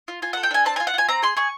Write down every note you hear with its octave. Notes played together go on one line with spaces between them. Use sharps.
F4
F4 G#5
A4 F#5
G5
D4 G#5
C4 A5
F4 G#5
F#5
F4 G#5
C4 A#5
G#4 C6
G#4 C#6